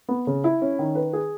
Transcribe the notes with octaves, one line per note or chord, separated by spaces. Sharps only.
B3
C#3
E4
C#4
D#3
B4
G#4